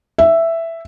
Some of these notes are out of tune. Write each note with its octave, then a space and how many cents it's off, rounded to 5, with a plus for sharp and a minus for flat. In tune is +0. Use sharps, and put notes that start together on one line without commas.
E5 +5